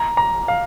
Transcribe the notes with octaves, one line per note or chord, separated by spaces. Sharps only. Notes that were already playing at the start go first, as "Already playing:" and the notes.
Already playing: A#5
A#5
F5